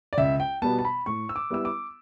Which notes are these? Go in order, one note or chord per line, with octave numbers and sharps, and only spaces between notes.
D5
C#2 E5
G5
B2 G3 B3 A5
A5
B5
A2 C#6
E6
D6
G3 B3 E4 E6
D6